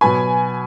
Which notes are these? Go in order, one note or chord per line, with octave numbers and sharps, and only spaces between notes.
B2 F#3 B3 G#5 B5